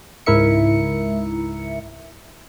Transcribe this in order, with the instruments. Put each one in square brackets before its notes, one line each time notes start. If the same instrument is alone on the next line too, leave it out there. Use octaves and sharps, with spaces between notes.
[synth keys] C#2 G#2 E4 A#4 E5 C#7